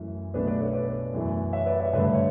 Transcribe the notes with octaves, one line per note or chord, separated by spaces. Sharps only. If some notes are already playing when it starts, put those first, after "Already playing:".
Already playing: F#2 E3 A3
B1 B2 A3 D4 B4 D5
B4 D5
A4 C#5
B4 D5
F#2 E3 A3
C#5 E5
B4 D5
C#5 E5
G2 D3 A3 B4 D5
C#5 E5